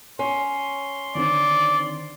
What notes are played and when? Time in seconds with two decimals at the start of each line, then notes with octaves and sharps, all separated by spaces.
0.19 C#4 C6
1.15 D3 D#3 C4 D5